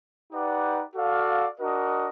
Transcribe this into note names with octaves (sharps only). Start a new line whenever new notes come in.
D#4 G4 B4 D5 F#5
F#4 A4 D5 F5
D4 F#4 A#4 D#5